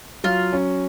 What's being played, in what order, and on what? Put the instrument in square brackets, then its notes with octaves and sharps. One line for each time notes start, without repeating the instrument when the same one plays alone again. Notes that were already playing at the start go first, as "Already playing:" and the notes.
[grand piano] F#3 [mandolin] F4
[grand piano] C#4